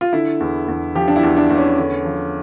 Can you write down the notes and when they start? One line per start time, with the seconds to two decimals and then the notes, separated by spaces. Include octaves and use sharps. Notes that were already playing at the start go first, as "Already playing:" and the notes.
0.01 F4
0.13 D3 E4
0.40 E2
0.68 E2
0.95 F3 G4
1.08 D4
1.16 E4
1.23 E2
1.37 D4
1.50 E2
1.57 C#4
1.78 D3
2.05 F3